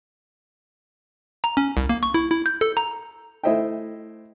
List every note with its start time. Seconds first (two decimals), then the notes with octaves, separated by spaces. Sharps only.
1.44 A#5
1.57 C#4
1.77 C2
1.89 A#3
2.03 C#6
2.14 E4
2.30 E4
2.46 G6
2.61 A4
2.77 A#5
3.43 A3 E4 C5 D#5 E5 G5